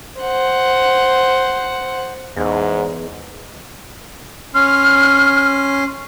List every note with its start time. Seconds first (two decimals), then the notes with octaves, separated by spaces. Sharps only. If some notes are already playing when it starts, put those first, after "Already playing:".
0.21 C5 F#5
2.36 E2 G#2
4.55 C#4 C6 F6